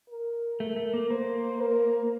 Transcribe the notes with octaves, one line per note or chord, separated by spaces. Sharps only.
A#4
A3 A#4
A3
A#3
A#3 C5
A#4